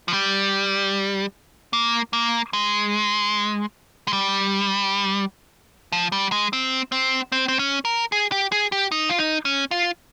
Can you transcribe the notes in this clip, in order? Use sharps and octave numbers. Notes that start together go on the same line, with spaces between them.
F3
G3
A#3
A#3
G#3
G#3
G3
F3
G3
G#3
C4
C4
C4
C4
C#4
A#4
G#4
G4
G#4
G4
D#4
F4
D#4
C#4
F4